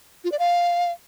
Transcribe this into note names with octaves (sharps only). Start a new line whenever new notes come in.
F4
D5
F5